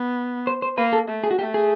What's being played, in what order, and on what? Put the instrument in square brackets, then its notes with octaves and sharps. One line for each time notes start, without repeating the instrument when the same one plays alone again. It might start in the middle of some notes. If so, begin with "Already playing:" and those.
Already playing: [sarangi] B3
[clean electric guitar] C5
C5
[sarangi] A#3 [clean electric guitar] B4
[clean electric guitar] A4
[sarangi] A3
[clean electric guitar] G#4
F#4
[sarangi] A3 [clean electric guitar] G4
[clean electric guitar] G#4